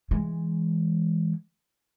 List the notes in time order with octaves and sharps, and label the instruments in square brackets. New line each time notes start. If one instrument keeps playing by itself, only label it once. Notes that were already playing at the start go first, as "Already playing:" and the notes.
[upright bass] E3 G#3